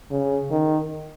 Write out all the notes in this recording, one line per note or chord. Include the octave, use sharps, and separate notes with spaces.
C#3
D#3